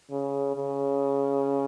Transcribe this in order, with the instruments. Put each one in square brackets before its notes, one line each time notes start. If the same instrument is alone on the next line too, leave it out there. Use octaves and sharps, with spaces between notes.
[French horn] C#3
C#3